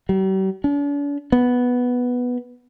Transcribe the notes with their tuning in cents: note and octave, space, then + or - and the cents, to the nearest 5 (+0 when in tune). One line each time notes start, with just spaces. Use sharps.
G3 -45
D4 -45
B3 +0